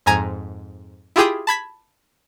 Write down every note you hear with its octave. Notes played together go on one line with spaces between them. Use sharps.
F2 G#2 G#5 A#5 G#6
E4 F4 G4 G#4 G5 D#6
A5 B5 G#6 B6